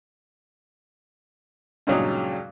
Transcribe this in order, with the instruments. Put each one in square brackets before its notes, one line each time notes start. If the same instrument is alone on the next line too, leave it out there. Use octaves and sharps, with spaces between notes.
[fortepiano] G2 A#2 C#3 F#3 G#3 D#4